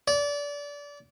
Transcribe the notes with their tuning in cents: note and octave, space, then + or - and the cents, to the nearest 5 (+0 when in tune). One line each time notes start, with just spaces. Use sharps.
D5 -25